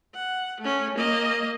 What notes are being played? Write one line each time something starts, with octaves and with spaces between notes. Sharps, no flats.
F#5
A3 C#4
A#3 D#5